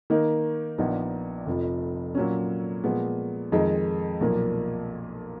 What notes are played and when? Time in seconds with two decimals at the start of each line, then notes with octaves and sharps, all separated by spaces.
0.10 D#3 A#3 D#4 A#4
0.78 A#1 A#2 F3 B3 D#4
1.46 F1 F2 F3
2.15 A#2 F#3 C#4
2.84 A#2 F3 G#3 B3
3.52 F2 D#3 G#3 D#4
4.20 B1 A#2 F3 A#3